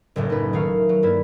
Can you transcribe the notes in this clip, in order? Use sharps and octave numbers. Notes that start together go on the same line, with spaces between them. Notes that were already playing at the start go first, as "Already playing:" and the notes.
F#1 C#2 A2
D#4 B4
D#3 A3 F#4 F5
F#3
G2 A#3 E4